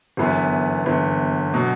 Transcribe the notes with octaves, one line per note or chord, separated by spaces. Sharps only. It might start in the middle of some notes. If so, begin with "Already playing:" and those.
G1 F#2 E3 B3
G1 F#2 E3 B3
B2 F#3